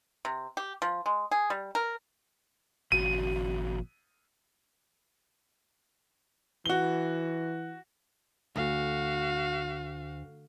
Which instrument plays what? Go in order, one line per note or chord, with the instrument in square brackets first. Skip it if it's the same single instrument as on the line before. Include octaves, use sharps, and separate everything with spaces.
[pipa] C3
G4
F3
G#3
G#4
G3
A#4
[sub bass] G#1 [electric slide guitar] A#2 C#3 F3 [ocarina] F#4 [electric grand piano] D#7
[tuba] E3 [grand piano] F#4 G7
[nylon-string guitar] D2 [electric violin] F#4 F5